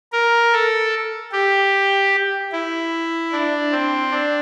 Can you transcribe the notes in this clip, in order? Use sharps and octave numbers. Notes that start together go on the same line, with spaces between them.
A#4
A4
G4
E4
D4
C4
D4